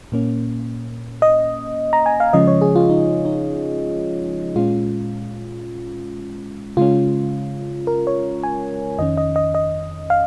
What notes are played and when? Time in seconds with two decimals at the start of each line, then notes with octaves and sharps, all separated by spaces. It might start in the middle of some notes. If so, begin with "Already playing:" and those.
0.12 A#2 A#3 C#4
1.22 D#5
1.93 A#5
2.06 G#5
2.20 F5
2.33 C#3 F3 G#3 C#4 D#5
2.47 C#5
2.61 G#4
2.76 F4
2.90 D#4
3.25 D#4
4.56 A#2 G#3 C#4 F4
6.77 C#3 G#3 C#4 F4
7.87 A#4
8.07 C#5
8.43 G#5
8.98 F2 D#3 C#4 D#5
9.17 D#5
9.36 D#5
9.55 D#5
10.10 F5